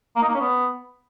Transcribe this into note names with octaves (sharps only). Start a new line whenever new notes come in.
A#3
D#4
A#3
C#4
B3